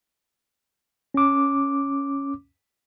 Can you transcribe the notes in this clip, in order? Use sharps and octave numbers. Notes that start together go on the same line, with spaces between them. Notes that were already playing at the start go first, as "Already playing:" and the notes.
C#4 D6